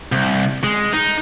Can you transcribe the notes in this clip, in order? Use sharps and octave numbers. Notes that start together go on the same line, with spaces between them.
C2
G#3
D#4